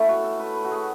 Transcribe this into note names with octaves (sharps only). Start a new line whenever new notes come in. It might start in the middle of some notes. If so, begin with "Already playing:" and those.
Already playing: A3 B3 C#4 E4
F#4
A4
B4
B4
F#4
G#4